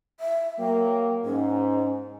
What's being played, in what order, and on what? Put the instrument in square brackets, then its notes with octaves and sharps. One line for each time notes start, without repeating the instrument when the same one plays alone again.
[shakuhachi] E5
[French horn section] F#3 A#3 [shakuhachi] G5
[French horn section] G#2 [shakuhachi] C#4